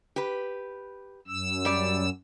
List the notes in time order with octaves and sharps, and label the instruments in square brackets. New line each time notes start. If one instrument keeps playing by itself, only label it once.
[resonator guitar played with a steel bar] G4 B4
[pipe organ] F#2 E6
[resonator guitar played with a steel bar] G3 D5